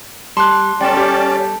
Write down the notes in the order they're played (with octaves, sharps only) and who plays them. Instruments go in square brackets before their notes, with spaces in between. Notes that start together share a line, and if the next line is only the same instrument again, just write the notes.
[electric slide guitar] G3 [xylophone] A5 D6 F#6 [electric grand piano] C6
[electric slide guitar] G3 A4 [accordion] C#4 D5 [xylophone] G5
[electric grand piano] G4